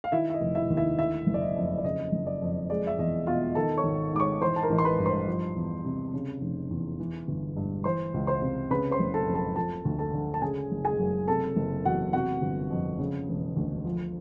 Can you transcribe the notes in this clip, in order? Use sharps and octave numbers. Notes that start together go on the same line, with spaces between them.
F5
D#3 E4 E5
E5
D#5
F1
E4 E5
D#2
E4 E5
D3 E4 E5
F#1
D5
D#5
F2
D5
C#3 D#5
F#1
D5
F2
G#3 D5
E5
E2 D#5
B2 F4 F5
D#3 A4 A5
C#5 C#6
G#1
G#2 D6
C#5 C#6
E3 C5 C6
A5
A#4 A#5
A1
C6
B4 B5
G2
C5 C6
F3
E2
C3
C#3
F1
E2
E3
G1
G2
E3 C5 C6
C#2
C5 C6
C3
C#3 B4 B5
C5 C6
F#1
A4 A5
F2
A4 A5
F3 A4 A5
D2
A4 A5
D3
A5
C#3 G#4 G#5
F#1
G#4 G#5
F#2
C3 A4 A5
F#1
E2 F#4 F#5
C3 F#4 F#5
G1
F2
C#3
E1
D2
F3